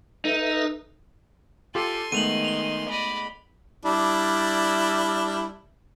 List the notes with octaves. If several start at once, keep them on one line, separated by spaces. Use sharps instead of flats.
D#4 A4 B4 E5
F4 G4 A4 G#5 C6
D#3 G#3 A3 B3 D#7 F7 F#7
F7 G7
D5 D#5 B5
G3 D4 E4